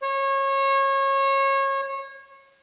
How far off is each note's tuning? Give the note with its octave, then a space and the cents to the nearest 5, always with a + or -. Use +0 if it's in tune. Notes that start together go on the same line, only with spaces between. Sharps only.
C#5 -25